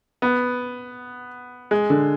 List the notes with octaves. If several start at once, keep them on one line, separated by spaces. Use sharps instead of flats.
B3
G#3
D3